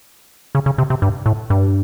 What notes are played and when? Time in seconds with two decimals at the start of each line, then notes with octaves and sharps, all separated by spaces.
0.55 C#3
0.66 C#3
0.78 C3
0.90 C3
1.02 G2
1.26 A2
1.50 G2